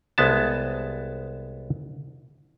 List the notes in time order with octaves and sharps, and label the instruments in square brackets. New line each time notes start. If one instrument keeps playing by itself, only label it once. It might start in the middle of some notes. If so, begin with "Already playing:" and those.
[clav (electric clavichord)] C2 G#3 B3 A5